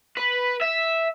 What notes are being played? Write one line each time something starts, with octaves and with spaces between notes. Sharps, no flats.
B4
E5